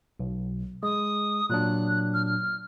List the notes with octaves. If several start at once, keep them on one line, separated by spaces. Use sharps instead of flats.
B1
G#3 D#6
A#2 F#3 D4 F#6
F6
F6